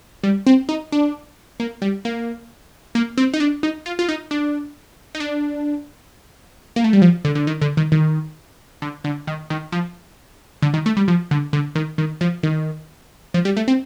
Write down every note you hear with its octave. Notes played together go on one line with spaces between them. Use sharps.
G3
C4
D#4
D4
A#3
G3
A#3
A#3
C4
D#4
D4
D#4
F4
F4
D#4
D4
D#4
D4
A#3
A3
G3
F3
D3
D3
D#3
D3
D#3
D#3
D3
D3
D#3
D#3
F3
D3
D#3
A3
G3
F3
D3
D3
D#3
D#3
F3
D#3
F3
G3
A3
C4